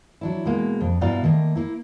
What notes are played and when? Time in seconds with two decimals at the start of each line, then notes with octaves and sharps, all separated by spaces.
0.21 F#3 D4 E4
0.45 B2 G#3 A#3
0.80 F2
1.01 G2 B2 E4 D5 F5 A#5
1.24 D#3 A3 A#3
1.56 A#3 E4